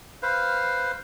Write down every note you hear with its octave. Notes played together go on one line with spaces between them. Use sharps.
B4 C5 F5